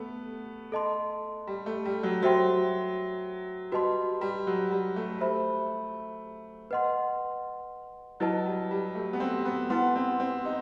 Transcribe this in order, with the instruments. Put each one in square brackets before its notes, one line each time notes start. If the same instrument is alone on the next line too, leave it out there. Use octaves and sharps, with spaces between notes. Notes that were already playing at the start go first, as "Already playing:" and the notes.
Already playing: [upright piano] A3 B3
[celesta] A4 D#5 A5 C6
[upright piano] G3
A3
G3
F#3
[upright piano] F#3 [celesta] F#4 C5 E5 G5 C6
[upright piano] G3 [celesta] F#4 B4 D#5 A5 C6
[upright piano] G3
F#3
G3
A3
[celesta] C5 E5 B5
B4 D#5 F#5 C6
[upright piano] F#3 [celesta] E4 B4 D#5 A5
[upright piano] G3
G3
A3
B3
C4
B3
[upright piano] B3 [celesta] E4 B4 F#5 C6
[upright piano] C4
C4
D#4